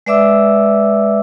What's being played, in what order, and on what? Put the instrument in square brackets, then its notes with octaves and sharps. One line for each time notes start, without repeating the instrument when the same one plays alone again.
[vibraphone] G#3 B4 D5 E5 D6 E6